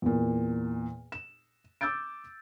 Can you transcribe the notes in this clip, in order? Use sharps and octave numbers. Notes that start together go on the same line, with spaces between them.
E2 A#2
E7
D6 E6 G6 A6 D7